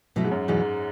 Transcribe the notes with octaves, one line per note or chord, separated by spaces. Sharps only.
B2 F#3 A3 E4
G#2
F#2
E2 G#2 B2 F#3 C#4 E4